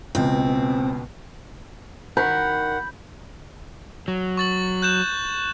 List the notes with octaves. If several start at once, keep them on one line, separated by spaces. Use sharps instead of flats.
C#2 B2 C4
D#3 F#5 B5 G6
F#3
C#6 A6 F#7
F#6 G6 E7